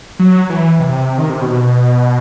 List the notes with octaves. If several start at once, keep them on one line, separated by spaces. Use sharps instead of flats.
F#3
E3
C3
D#3
C3
B2